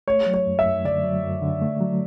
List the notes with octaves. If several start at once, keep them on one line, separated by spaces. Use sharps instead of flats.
A3 C#5
F#3
C#5
F#2
E5
F#2
D3 D5
F#3
F#2
D3
A3
F#3